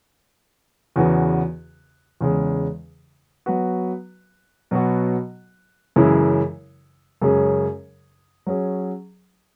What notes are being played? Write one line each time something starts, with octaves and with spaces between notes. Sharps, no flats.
E2 C#3 E3 B3 F#4
E2 C#3 G#3
F#3 B3 F#4 B4
B2 F#3 B3 F#4
F#2 C#3 E3 G#3 E4
F#2 C#3 G#3 C#4 G#4
F#3 C#4 G#4